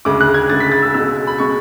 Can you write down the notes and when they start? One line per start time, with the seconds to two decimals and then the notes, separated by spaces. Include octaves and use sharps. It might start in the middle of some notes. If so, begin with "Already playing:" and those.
0.05 D2 C#3 G#3 D6
0.21 F#6
0.34 G#6
0.50 D2 C#3 G#3 A6
0.60 B6
0.72 A6
0.82 E6
0.94 C#2 B2 G#3 E6
1.27 B5
1.38 B2 G#3 C#6